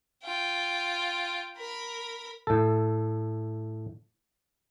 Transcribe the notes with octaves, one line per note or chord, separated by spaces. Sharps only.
F4 G5
A#4 B5
A2 A4